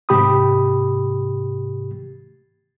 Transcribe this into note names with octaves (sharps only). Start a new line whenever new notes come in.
G#2 C3 G4 B5 D#6